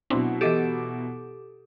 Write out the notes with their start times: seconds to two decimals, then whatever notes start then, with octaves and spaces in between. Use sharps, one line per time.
0.10 B2 F#3 C4 D4 E4
0.41 E3 G4 A4 D#5 D6 D#7